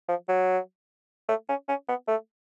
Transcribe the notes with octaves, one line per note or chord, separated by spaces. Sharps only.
F3
F#3
A3
C#4
C#4
B3
A3